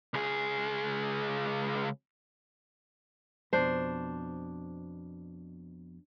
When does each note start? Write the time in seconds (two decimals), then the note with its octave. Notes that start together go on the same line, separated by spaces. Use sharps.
0.14 C#2 G#4
3.53 F2 B2 D4 C5